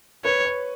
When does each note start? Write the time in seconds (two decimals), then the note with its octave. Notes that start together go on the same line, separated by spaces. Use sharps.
0.25 B4 C#5
0.45 C#5